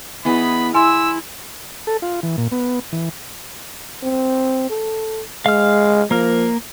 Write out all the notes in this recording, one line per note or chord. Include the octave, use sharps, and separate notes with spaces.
E3 B3 G#4 D#5 B5
E4 G#5 C6 E6
A4
F4
E3
A#2
B3
E3
C4
A4
G#3 F5 F6
F3 A#3 A#4